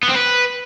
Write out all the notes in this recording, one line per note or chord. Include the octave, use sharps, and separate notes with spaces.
B3
C4
B4